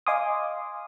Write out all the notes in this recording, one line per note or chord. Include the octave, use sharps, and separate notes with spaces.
D#5 F5 G#5 C6 D6 D#6